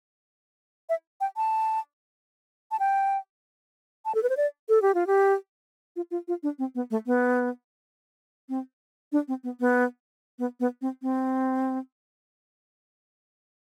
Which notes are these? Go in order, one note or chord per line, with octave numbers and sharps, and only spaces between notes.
E5
G5
A5
A5
G5
A5
A4
B4
C5
D5
A4
G4
F4
G4
F4
F4
F4
D4
C4
B3
A3
B3
C4
D4
C4
B3
B3
B3
B3
C4
C4